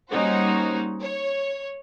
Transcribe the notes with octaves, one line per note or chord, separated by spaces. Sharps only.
G3 A#3 C#4 D#4 F#4 C5
C#5